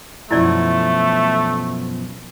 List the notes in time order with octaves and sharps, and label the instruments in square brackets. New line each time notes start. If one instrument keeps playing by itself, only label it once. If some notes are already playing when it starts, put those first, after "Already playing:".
[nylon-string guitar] F#2 B2 F3 [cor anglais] A3 [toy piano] E4 D5